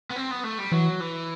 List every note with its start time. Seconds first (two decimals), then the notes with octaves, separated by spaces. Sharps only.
0.10 B3
0.16 C4
0.31 B3
0.44 A3
0.58 G3
0.72 E3 F#3
1.00 E3